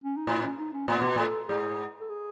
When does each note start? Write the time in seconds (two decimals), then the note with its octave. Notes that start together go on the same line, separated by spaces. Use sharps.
0.04 C#4
0.16 D#4
0.27 A2 E4
0.42 C#4
0.58 D#4
0.73 C#4
0.88 A2 B3
1.02 B2
1.16 A2 A4
1.48 G#2 G#4
2.00 A4
2.09 G#4